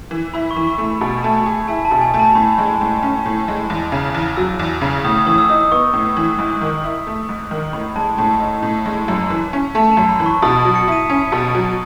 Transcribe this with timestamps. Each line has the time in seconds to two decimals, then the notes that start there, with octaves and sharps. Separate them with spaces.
0.11 E3
0.34 E4 B5
0.51 C#6
0.56 E3
0.67 C#6
0.78 A3
0.84 B5
1.01 B2 G#5
1.23 A3 A5
1.46 G#4
1.68 E4 G#5
1.85 A5
1.91 B2
2.01 G#5
2.14 A3
2.19 A5
2.35 A2 B5
2.58 G#3
2.81 A2
3.03 C#4
3.26 A2
3.48 G#3
3.70 E2
3.92 C#3
4.14 E2
4.37 F#3 E6
4.59 E2
4.81 C#3
5.04 A2 D#6
5.27 E3 D#6
5.38 E6
5.49 D#4 D#6
5.72 B3 C#6
5.94 A2
6.17 E3
6.39 G#2
6.61 D#3
6.84 E4
7.07 A3
7.29 G#2
7.51 D#3
7.73 A2 B5
7.96 G#3 A5
8.18 A2 A5
8.40 D#4
8.63 A2
8.86 G#3
9.08 F#2
9.30 E3
9.53 C#4
9.75 A3 A5
9.91 A5
9.97 F#2
10.09 B5
10.20 E3
10.26 C#6
10.42 B2 D#6
10.59 D#6
10.65 F#3
10.75 C#7
10.88 E4 D#7
11.09 C#4 D#7
11.32 B2
11.55 F#3